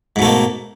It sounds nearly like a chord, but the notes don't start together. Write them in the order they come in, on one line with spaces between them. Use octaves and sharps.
G#2 B2 A3 A#3